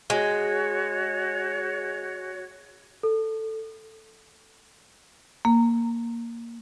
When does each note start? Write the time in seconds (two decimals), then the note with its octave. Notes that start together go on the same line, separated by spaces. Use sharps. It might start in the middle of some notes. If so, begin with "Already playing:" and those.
0.10 G#3 F#4 C#5
3.03 A4
5.45 A#3